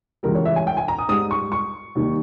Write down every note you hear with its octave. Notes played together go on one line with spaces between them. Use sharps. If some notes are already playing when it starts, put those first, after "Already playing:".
C#2 C#3 E3 G3 A#4
C#5
E5
G#5
G5
G#5
A#5
D#6
G#2 G3 D#6
C#6
C#6
D#2 D#3 G3